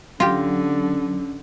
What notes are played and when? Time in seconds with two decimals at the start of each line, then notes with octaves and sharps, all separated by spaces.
0.20 D3 F#3 C#4 F4 G4